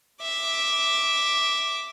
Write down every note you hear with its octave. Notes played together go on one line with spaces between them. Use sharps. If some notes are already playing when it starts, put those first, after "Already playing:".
E5 D6